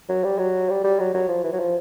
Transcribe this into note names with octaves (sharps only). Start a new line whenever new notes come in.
F#3
G3
F#3
G3
G3
F#3
F#3
F3
E3
F#3
F3